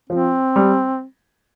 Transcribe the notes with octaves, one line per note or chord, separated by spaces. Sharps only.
F3 C4
G3